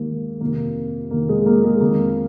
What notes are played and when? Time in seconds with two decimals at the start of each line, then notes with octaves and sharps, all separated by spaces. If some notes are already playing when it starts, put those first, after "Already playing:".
Already playing: D#2 D#3 G#3 A#3
0.41 F2 C3 D#3 A#3
1.11 F2 C3 D#3 A#3
1.29 G#3
1.46 A#3
1.64 G#3
1.80 F2 D#3 A#3